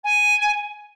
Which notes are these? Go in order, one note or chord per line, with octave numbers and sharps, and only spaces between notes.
G#5